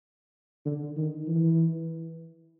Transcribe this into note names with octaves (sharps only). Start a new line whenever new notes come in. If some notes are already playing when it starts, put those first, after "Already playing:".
D3
D#3
E3